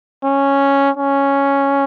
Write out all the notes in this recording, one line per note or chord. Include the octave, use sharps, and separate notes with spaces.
C#4
C#4